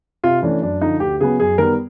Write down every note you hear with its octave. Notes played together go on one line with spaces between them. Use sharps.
C3 F4
E3 A3 C#4 D4
F#2 D4
D3 F3 D#4
D2 G4
C#3 F#3 B3 G#4
F#2 G#4
D#3 G3 B3 A#4